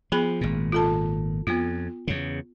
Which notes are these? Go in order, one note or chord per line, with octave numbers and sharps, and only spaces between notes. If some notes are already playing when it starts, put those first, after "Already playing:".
F3 B3 G#4 B5
G#1 A#2
F4 A4 A5
F2 B3 F4
E2 C#3